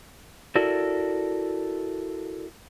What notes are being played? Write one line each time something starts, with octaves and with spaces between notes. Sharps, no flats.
E4 F#4 A4 A#4 D5